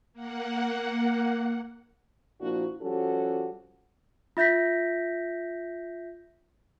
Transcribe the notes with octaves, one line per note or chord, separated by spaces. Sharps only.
A#3 F#5
A#2 F3 A#3 D4 E4 F#4
F3 G3 C#4 F#4 G4 A4
F4 E5 G6 A#6 B6